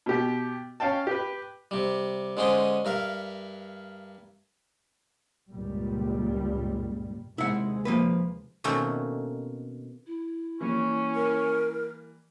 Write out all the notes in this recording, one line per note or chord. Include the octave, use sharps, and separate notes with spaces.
B2 G4
C#4 F5 G5 A5
G4 B4
C3 G3
D3 G#3 C#4 C5 C6 D#6
G2 A#4 E5 F5
C#2 G2 A#2 G3
D#2 C3 G#3 E4 F#5
F3 A#3 B4
B2 D#3 A3 A#3 C4 C#4
E4
E3 G3 A#3 C#4
A#4